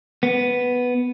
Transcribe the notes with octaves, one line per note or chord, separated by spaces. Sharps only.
B3